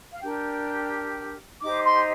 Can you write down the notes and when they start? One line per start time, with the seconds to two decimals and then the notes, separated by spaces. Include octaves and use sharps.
0.12 F5
0.22 D4 G4 A#4 G5
1.61 D#4 G4 C5 D6
1.84 C6